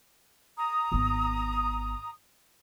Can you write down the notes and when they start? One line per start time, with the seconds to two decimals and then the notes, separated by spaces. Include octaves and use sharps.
0.58 A#5 D#6
0.92 G#1 B3